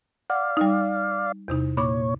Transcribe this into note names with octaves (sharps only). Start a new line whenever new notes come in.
D5 F5 F#5
G3 D#4
E2 C3 D#4
A#2 C#5 B5 D6